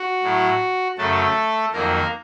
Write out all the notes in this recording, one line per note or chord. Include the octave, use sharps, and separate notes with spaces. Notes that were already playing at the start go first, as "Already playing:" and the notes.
Already playing: F#4
A2 F#3
F#2 C#3 F#3 A3 A4
F2 D#3 F#3 A#3 A#4